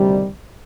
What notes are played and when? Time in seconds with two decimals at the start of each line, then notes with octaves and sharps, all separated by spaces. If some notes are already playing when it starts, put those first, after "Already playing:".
Already playing: D2 C3 D#3 G3